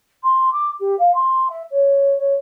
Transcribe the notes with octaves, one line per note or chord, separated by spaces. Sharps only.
C6
D6
G4
F5
C6
E5
C#5
C#5